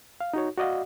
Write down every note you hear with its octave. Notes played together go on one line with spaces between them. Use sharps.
F5
D#4 F#4 C#5
F#4 D5 D#5 F5 F#5